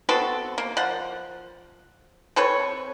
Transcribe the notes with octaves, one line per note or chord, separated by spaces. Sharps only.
B3 C4 F#4 A4
A#3
F3 F#5
C4 A4 B4 C#5